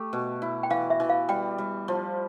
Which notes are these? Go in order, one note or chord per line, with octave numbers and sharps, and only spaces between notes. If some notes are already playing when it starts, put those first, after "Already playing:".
Already playing: A3 G4
B2
E4
G5
E3 F5
E5
E3
F5
G3 G5
G3
F3